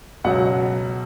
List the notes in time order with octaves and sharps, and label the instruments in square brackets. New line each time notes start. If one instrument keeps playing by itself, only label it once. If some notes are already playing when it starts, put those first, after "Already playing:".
[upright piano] C#2 B2 F#3 F#5